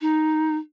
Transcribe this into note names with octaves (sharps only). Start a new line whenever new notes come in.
D#4